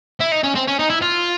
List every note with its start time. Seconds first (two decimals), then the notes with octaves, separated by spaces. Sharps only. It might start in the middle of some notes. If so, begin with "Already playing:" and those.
0.20 E4
0.32 D#4
0.43 C#4
0.55 C4
0.67 C#4
0.79 D#4
0.90 E4
1.02 F4